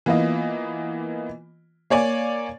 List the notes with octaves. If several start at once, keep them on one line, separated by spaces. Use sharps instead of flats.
E3 A#3 B3 F4 D#5
A#3 C#5 D5 G#5